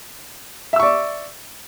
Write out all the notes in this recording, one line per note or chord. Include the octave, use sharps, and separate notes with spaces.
D5 E5 C#6 E6